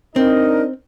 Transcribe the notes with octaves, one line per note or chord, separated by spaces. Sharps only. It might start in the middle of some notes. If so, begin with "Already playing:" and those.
C4 D4 D#4 A#4 D#5